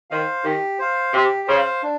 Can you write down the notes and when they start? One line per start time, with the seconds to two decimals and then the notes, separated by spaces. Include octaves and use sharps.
0.11 D#3 C5 F5
0.44 D#3 G4
0.79 C5 F5
1.13 C3 G4
1.48 C#3 C5 F5
1.83 D4